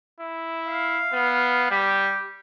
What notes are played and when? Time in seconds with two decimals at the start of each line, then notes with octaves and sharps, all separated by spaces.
0.20 E4
0.67 F5
1.13 B3
1.71 G3 G4